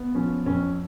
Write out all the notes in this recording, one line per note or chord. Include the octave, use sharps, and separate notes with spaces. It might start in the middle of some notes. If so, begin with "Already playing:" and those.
Already playing: B3
F3 C#4
F2 C#4